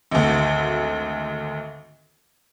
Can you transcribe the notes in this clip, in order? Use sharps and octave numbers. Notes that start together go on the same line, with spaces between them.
G#1 D2